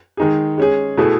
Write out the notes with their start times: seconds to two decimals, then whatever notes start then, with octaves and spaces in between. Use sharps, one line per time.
0.17 D#3 G#3 D#4 G#4
0.58 G#3 C#4 G#4
0.98 B2 A3 E4 G#4